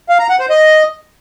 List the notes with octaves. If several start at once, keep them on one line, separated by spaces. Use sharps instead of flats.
F5
A#5
F#5
C5
D#5